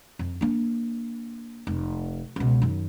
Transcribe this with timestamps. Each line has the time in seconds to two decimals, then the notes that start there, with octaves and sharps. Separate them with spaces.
0.19 F2
0.41 A#3 D4
1.67 F1
2.36 C#2 B2
2.62 F#2 D#3